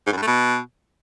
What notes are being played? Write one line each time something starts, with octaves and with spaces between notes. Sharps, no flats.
G#2
F#2
G2
A3
B2